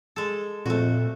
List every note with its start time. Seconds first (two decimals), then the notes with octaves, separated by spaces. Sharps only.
0.16 G#3 A4
0.66 F2 A#2 A3 F#4